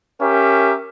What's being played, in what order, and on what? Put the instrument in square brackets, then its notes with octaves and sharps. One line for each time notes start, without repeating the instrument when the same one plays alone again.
[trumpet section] C#4 G4 A#4 E5